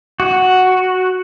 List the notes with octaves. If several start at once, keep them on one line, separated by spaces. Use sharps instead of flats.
F#4